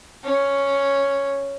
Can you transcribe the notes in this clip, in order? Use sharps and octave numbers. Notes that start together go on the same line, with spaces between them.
C#4